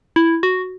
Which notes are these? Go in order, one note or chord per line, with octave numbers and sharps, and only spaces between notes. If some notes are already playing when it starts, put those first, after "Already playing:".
E4
F#4